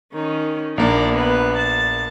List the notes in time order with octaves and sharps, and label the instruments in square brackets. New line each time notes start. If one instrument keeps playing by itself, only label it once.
[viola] D#3 C#4
[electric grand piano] A#1 A#3 D4 [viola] D5 A#5
[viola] B3 B4
A5